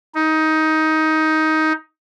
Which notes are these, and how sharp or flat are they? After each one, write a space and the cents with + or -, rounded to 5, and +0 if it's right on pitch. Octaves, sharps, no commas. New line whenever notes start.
D#4 +15